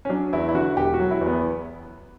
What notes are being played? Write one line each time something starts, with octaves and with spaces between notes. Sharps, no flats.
C#4
F#3 D4
E2 E4
E4
D3 F#4
E1 G4
F#4
F#3
E4
E2
B3